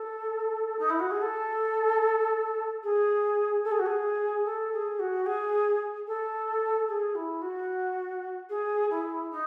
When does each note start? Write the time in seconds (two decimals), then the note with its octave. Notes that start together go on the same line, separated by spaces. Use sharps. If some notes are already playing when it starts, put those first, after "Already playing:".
Already playing: A4
0.79 D#4
0.89 E4
0.99 F#4
1.10 G#4
1.21 A4
2.83 G#4
3.64 A4
3.71 G#4
3.79 F#4
3.86 G#4
4.45 A4
4.72 G#4
4.99 F#4
5.26 G#4
6.07 A4
6.88 G#4
7.15 E4
7.42 F#4
8.49 G#4
8.90 E4
9.31 D#4